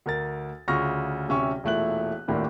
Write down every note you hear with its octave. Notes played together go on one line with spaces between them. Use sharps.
D2 A#4 A6
D2 C#3 F4 C#6 F6 A#6
D1 C3 C#4 E5 C#6
E1 A#2 A3 E4 F#6 F#7
D#1 G#1 A2 A3 A#3 D4